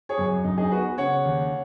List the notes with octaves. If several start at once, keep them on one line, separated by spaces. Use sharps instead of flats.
G#4 C#5
F#2
F#2 D#4
D#4 G#4
B3 F#4 B4
C#3 C#5 F#5
D#2